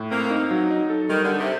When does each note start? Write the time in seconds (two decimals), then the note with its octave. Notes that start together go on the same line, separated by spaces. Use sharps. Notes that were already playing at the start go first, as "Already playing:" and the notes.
Already playing: A2
0.11 A#3 C4
0.31 D#4
0.51 F#3
0.70 D#4
0.90 A4
1.10 D#3 G3
1.24 D3
1.30 G4
1.39 C3